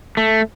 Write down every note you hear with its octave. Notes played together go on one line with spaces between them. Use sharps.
A3